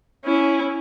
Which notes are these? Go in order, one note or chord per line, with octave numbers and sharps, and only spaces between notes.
C#4 E4